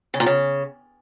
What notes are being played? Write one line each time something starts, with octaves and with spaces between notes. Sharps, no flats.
C#3
A#2
C#3